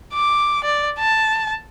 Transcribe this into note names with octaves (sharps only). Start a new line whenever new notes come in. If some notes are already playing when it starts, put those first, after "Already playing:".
D6
D5
A5